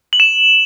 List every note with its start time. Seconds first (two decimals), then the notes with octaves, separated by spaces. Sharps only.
0.13 F#7
0.20 E7